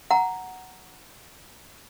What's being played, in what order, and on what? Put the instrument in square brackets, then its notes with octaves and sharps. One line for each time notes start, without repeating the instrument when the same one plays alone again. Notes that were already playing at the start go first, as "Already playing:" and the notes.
[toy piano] F#5 A#5